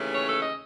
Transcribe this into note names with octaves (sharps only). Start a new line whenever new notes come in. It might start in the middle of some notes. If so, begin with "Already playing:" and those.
Already playing: D#2 C#3 E3 A3 C#4
C#5
A4
D#5